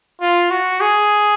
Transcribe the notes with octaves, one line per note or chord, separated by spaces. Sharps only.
F4
F#4
G#4